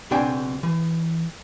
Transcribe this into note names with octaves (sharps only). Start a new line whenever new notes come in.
B1 C#3 C4 D4 G5 G#5
E3